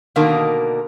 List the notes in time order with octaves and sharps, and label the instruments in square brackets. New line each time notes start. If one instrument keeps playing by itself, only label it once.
[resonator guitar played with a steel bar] B2 D3 D#3 A#3